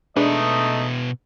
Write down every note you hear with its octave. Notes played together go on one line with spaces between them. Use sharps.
B2 G#3 A3 D4 D#4 B4 D#5 E5